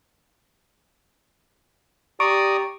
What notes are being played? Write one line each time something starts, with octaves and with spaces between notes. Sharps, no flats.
G4 D5 A#5 C#6 D#6 D7